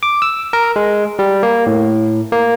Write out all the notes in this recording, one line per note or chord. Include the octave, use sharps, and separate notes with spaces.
D6
E6
A#4
G#3
G3
A#3
A2
A#3